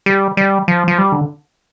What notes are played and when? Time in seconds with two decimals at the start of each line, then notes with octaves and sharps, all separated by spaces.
0.06 G3
0.37 G3
0.68 F3
0.88 F3
0.98 G3
1.12 D3